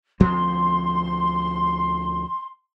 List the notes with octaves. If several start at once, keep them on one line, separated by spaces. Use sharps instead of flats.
D2 F3 C4 C6